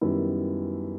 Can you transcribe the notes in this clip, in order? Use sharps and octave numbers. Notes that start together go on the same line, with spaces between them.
F#2 D#3 G3 B3 E4